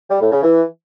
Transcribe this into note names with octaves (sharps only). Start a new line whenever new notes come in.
G3
A2
C#3
E3